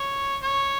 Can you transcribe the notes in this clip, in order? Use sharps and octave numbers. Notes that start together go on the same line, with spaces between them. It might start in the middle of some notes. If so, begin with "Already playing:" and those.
Already playing: C#5
C#5